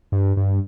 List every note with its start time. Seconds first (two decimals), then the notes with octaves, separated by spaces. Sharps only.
0.12 G2
0.37 G2